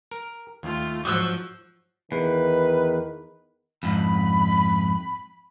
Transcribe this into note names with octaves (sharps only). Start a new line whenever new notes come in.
A#4
D#2 A3 F4
G#2 F3 F#3 C#6 D#6 E6 F#6 G6
E2 D#3 B4
F2 G#2 B5